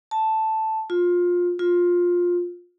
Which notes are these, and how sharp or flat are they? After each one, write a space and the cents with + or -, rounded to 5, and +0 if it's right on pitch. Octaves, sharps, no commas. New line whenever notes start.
A5 +0
F4 +20
F4 +15